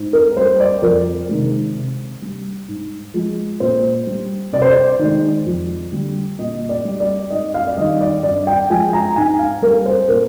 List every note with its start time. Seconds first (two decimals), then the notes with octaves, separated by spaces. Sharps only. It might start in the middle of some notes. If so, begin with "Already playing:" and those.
Already playing: G#2
0.13 A#4
0.36 G3 C5
0.60 D5
0.82 F2 A#4
1.29 C3 D#3 G#3
1.75 C3
2.22 G3
2.68 G#2
3.14 F3 G#3
3.60 A#2 C5
4.07 G3
4.53 C3 D5
4.62 C5
4.71 D5
4.99 D#3 G#3
5.46 F2
5.92 D3 G3
6.39 A#2 D#5
6.69 D5
6.85 G3
7.00 D5
7.30 G#2 D#5
7.54 F5
7.67 D5
7.77 D#3 G3 D#5
8.01 D5
8.23 G2 D5
8.47 G5
8.70 F3 G#3 G#5
8.93 A#5
9.16 G#2 G#5
9.39 F5
9.62 G3 A#4
9.86 C5
10.09 A#2 A#4